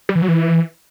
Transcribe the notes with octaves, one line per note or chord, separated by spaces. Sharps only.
G3
E3
F#3
E3